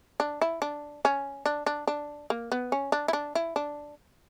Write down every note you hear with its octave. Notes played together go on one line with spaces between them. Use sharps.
D4
E4
D4
C#4
D4
D4
D4
A#3
B3
C#4
D4
E4
D4
E4
D4